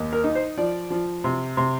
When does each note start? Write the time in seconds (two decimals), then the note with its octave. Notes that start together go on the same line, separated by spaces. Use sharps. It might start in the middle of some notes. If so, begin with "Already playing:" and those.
Already playing: D#2
0.13 A#4
0.24 D#4
0.35 C5
0.57 F3 D5
0.90 F3
1.24 C3
1.57 C3